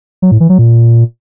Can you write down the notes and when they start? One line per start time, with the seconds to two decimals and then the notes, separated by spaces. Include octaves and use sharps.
0.22 F#3
0.31 A2
0.40 E3
0.49 F#3
0.58 A#2